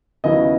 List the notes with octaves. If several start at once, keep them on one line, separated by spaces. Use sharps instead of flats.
D#2 C#3 F#3 B3 E4 D#5